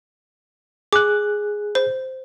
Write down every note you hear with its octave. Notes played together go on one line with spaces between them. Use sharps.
G#4 D6 F#6
C5